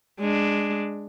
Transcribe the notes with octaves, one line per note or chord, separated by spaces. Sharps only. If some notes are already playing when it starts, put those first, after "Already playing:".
G#3 D4